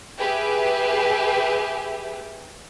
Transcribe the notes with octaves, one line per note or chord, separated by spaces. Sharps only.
G4 G#4 B4 E5